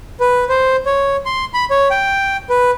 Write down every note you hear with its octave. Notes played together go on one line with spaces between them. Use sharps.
B4
C5
C#5
C6
B5
C#5
G5
B4